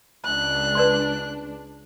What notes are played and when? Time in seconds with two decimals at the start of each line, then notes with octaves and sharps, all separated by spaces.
0.25 C#2 D4 F#6
0.75 B4 D5 C6